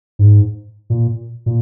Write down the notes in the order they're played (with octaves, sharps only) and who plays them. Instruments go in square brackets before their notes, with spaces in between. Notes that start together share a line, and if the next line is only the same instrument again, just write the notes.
[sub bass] G#2
A#2
A#2